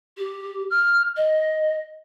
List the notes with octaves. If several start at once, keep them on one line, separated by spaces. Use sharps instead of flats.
G4
F6
D#5